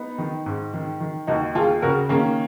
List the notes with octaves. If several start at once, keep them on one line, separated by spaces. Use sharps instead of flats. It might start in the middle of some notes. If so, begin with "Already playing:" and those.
Already playing: B3 D#4
D#3
G#2
D#3
D#3
D#2 D#4 F#4
D#2 F4 G#4
C#3 F#4 A#4
D#3 A#3 C#4